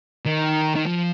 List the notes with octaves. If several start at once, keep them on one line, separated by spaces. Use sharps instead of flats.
D#3
D#3
F3